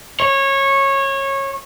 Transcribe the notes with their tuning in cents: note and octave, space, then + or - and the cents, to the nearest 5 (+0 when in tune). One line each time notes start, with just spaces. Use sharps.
C#5 -20